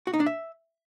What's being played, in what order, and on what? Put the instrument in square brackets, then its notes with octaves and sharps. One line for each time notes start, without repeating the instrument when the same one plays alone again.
[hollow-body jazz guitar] F#4
D#4
D4
E5